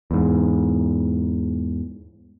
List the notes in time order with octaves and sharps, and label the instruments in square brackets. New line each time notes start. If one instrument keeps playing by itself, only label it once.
[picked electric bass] E2 G#2